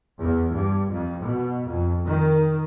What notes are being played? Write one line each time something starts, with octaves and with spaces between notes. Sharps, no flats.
E2
G2
F2
B2
F2
D#3